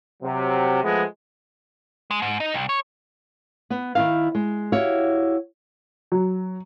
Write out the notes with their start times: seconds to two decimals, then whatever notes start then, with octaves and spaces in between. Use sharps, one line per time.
0.23 C3 F#3
0.83 F3 G#3 A3 B3
2.11 G#3
2.22 G#2
2.40 D#4
2.54 C2
2.69 C#5
3.70 B3
3.95 D#3 E4 F5
4.35 G#3
4.72 E4 F#4 G4 C#5 F5
6.12 F#3